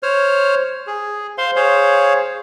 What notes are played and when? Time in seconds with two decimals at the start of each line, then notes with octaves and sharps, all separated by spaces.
0.03 C5 C#5 F6
0.87 G#4
1.38 C5 F5 C6
1.56 G#4 C5 C#5 F5